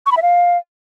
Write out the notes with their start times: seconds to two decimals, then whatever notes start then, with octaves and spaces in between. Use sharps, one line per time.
0.06 C#6
0.11 B5
0.17 E5
0.22 F5